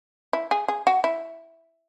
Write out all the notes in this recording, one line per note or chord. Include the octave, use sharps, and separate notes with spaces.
E4
G#4
G#4
F#4
E4